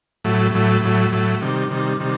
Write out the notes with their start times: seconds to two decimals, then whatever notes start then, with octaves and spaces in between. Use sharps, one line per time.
0.24 A2 F#3 A3
0.54 A2 F#3 A3
0.84 A2 F#3 A3
1.12 A2 F#3 A3
1.41 C3 D#3 G3
1.70 C3 D#3 G3
2.00 C3 D#3 G3